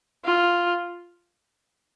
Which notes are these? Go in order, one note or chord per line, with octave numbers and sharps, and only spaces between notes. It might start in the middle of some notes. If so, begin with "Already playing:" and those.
F4